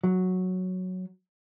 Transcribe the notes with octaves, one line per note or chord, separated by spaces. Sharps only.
F#3